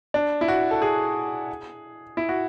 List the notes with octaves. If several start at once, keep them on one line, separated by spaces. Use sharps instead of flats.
D4
E4
F#4
A4
G#4
E4
F#4